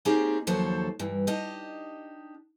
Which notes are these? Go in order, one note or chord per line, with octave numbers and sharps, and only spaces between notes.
A#3 C4 C#4 D#4 G4 G#4
D#2 F3 F#3 A4 C5 C#5
G2 E3
D4 D#4 G4 D#5